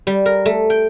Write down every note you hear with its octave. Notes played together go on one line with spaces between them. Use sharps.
G3
A#4
A3
G5